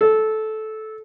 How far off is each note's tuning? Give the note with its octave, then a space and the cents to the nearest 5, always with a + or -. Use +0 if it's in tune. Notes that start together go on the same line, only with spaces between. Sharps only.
A4 -15